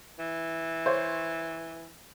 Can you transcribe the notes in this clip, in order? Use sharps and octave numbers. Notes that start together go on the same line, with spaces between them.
E3
C5 C#5